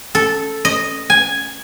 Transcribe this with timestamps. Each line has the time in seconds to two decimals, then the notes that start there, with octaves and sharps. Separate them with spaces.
0.15 A4
0.65 D#5
1.10 G#5